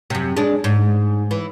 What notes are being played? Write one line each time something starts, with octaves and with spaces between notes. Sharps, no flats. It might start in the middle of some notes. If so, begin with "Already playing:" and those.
F#2 C3
G#3 D4
G#2
E3